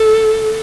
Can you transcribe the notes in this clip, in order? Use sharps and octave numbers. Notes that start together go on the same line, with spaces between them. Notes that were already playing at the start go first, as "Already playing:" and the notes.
Already playing: A4